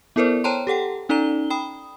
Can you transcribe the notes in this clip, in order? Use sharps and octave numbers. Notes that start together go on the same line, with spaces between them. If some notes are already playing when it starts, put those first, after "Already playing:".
B3 E4 A4 A#4 C5 D5
C5 C#5 G5 A5 A#5 C6
G4 A4 F#5 G5
C#4 D#4 A4 D5 A#5 G7
G5 B5 D#6